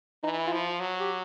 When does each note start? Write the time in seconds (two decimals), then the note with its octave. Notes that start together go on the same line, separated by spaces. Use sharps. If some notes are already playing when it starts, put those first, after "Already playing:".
0.23 E3 D#4
0.38 E4
0.47 F4
0.52 F3 E4
0.66 F4
0.80 F#3
1.00 G4